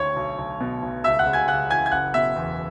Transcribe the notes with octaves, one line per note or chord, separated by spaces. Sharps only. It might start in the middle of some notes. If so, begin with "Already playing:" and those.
Already playing: D2 C#5 C#6
B1
B1
B2
B1
C#2 E5 E6
F#5 F#6
C#3
G#5 G#6
C#2 F#5 F#6
E3 G#5 G#6
G#6
F#1 F#5 F#6
B2 E5 E6
E2